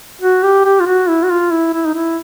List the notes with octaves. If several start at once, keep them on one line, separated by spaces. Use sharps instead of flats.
F#4
G4
G4
F4
F#4
E4
F#4
F4
E4
E4
D#4
E4